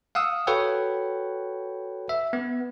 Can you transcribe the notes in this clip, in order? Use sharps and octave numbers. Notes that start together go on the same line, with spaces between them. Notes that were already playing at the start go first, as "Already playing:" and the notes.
F5 F#5 D#6 E6
F#4 A4 B4 C#5 F#5 G5
E5
B3